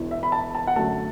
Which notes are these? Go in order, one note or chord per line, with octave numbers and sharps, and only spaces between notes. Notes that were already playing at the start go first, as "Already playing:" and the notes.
Already playing: E1 E2 E3
E5
B5
A5
A5
F#5
F#2 D3 F#3 A3 A5